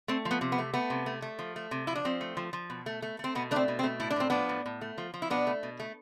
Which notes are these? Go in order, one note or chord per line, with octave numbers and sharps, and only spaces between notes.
A3 C4
F3
B3
C3
B3
A3
A3 B3
C3
A3
A3
F3
A3
C3
F3 E4
D4
F3 C4
A3
F3
F3
B2
A3
A3
A3 C4
B2 B3
A3 C4 D4
B2
C4
A3
A2 E4
D4
A2 C4
F3 B3 D4
A2
A2
A3
F3
F3
E4
B2 B3 D4
A3
B2
A3